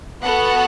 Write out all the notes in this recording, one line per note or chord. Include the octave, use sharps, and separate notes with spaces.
B3 F#4 A4 F#5